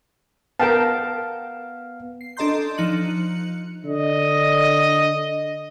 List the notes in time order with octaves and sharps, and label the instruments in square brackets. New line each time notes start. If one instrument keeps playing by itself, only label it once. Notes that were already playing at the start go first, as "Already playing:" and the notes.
[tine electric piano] B3 F5 [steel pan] A#4 G5 A5
[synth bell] C7
D4 A4 D#5 A#5 C6 G6
F3 D#4 F#6 C#7 F#7
[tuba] D3 [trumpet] D#5